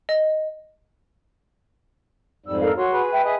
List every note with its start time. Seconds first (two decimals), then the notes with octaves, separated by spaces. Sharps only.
0.09 D#5
2.46 F2 G#2 G3 E6
2.61 A4 A#4 F5
2.77 F#4 C#5 C6
2.93 G#4 B4
3.13 E5 G5 G#5
3.25 G#4 D#5 E5 G#5